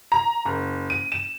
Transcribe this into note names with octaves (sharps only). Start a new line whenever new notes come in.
A#5
F#1
D#7
E7